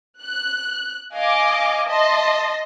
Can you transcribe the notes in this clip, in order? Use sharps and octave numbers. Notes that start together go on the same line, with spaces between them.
F#6
D#5 F5 G#5 D6
D#5 E5 A5 C6